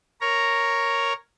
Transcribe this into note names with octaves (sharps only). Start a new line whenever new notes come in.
A#4 C#5 A#5